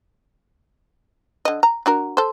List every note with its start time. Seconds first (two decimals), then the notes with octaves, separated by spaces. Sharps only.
1.45 D3 D#5
1.63 A#5
1.86 D4 F#4 A#4
2.17 A4 C5